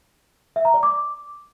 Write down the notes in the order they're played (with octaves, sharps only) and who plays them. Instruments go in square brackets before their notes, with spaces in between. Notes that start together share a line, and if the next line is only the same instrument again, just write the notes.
[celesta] E5
A#5
D5
D6